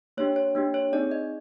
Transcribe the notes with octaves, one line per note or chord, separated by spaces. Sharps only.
A#3 D4 G4 C#5
C#5
A#3 D4 G4
C#5
C4 D#4 G#4 D5
D#5